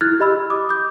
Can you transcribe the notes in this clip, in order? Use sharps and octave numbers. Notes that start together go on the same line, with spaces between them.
E4 F6 F#6 G#6 A6
G4 D#5 B5 E6
D6 D#6
D6 G6